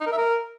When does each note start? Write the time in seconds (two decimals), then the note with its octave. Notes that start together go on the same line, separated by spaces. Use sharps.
0.01 D#4
0.06 A#4
0.12 E5
0.18 A#4